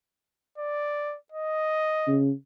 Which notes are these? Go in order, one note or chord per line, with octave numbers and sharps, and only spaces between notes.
D5
D#5
C#3